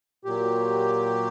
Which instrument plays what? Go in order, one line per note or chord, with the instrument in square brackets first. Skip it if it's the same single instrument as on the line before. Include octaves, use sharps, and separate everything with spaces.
[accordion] A#2 F#3 G4